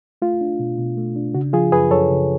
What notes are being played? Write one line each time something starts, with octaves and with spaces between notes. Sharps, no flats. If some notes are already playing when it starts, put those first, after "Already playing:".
A3 F4
D4
B2
B2
A3
D4
C#3 F#4
F3 F4 G#4
F#2 G#4 B4
F#2 A4 C#5
C#3